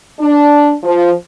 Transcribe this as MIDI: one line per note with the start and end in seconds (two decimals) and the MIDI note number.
0.20 0.74 62
0.83 1.12 53